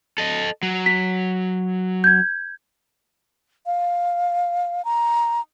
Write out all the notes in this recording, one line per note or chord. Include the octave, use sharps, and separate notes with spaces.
A4 D#5
F#3
B6
G6 G#6
F5
A#5